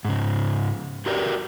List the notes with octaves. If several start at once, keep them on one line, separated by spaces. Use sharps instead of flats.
G#2 C#3
F#4 G4 A#4 B4 D5